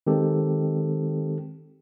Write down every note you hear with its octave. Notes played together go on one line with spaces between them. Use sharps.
D#3 G#3 C4 G4 A4